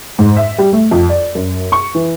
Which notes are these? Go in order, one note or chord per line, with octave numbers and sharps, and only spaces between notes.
G#2
E5
G3
A3
F2
D5
F#2
C#6
E3